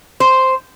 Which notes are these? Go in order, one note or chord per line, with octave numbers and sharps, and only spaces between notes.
C5